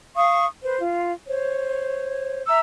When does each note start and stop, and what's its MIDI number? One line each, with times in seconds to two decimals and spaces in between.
0.16 0.45 77
0.16 0.45 85
0.16 0.45 87
0.63 0.79 71
0.63 0.79 72
0.79 1.10 65
1.27 2.42 72
1.27 2.42 73
2.47 2.59 76
2.47 2.59 82
2.47 2.59 88